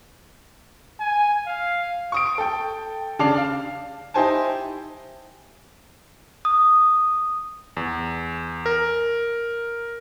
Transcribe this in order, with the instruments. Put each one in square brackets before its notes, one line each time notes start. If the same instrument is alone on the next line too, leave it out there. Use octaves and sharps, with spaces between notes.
[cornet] G#5
F5
[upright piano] C#6 D#6 D7
A4 G5
C#3 D4 A5 D6 C7 F7
F5
D#4 E4 G4 C5 G#5 A5
[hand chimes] D#6
[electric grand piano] E2
A#4